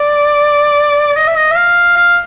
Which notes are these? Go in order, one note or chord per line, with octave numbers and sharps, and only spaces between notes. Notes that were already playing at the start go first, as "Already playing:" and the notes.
Already playing: D5
D#5
E5
D#5
E5
F5
F5